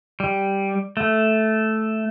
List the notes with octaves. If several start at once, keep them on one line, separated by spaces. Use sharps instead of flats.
G3
A3